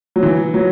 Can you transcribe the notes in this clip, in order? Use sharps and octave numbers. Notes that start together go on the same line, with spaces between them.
F#3
E3
F#3